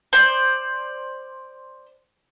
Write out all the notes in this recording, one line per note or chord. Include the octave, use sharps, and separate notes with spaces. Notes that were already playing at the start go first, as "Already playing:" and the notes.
C5 D5